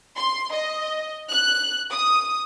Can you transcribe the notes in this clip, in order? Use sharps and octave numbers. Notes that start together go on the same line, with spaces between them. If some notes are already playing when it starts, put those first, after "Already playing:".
C6
D#5
F#6
D#6